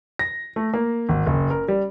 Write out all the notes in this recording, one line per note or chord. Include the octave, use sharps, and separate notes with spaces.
A#6
A3
A#3
G#1
F#1
A#4
G3